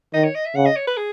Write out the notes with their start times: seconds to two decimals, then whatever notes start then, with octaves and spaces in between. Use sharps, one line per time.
0.14 D#3 D#5
0.24 C#5
0.35 D#5
0.45 E5
0.55 C#3 F#5
0.65 D#5
0.76 C#5
0.87 B4
0.97 G#4